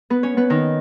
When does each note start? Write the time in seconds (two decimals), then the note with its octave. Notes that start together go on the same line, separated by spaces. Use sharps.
0.10 B3 B4
0.23 C#4 C#5
0.37 B3 B4
0.50 D#3 D#4